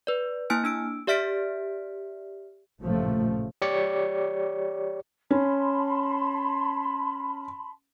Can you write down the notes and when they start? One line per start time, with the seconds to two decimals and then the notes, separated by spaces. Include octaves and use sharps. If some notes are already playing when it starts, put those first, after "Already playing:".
0.07 B4 D5
0.50 A#3 E4 G#5 F6 D7
0.64 D4 E6 D7
1.07 G4 D5 E5 F6 B6 D7
2.81 A1 G2 A#2 C#3 F3 A3
3.62 G4 C#5 D5 C#7
5.31 C#4 A5 B5 C6